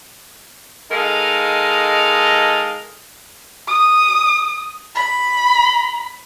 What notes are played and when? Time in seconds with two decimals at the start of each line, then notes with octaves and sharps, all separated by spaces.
0.91 G#3 D#4 A4 A#4 D#5 F5
3.68 D#6
4.95 B5